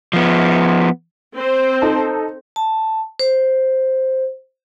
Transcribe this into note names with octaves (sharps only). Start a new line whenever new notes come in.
F3 B3
C4 C5
D#4 A4
A5
C5